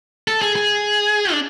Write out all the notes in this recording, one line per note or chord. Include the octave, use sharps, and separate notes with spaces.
A4
G#4
G#4
D4